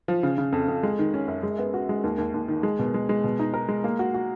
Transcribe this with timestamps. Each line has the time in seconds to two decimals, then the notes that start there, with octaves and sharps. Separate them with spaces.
0.08 F3
0.23 C#3
0.38 C#3
0.53 F2
0.68 F2
0.83 G#3
0.99 D#3
1.14 C#4
1.28 F#2
1.43 G#3
1.59 B3
1.74 F#4
1.89 G#3
2.04 D#2
2.18 D#2
2.34 D#2
2.48 D#3
2.63 G#3
2.79 B2
2.94 G#3
3.09 G#3
3.24 B2
3.39 D#4
3.54 A#4
3.69 G#3
3.84 A#3
3.99 F#4
4.14 F#4